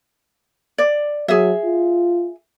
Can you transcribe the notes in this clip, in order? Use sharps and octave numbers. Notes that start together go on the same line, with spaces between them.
D5
F#3 G#4 E5
F4